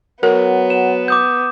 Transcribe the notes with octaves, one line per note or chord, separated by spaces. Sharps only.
F#3 B3 A#4
E7
D6 D#6 G6